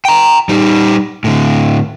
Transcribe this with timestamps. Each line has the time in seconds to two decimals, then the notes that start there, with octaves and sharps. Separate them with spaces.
0.05 G5 A#5
0.49 G3 D#4
1.24 A2 D3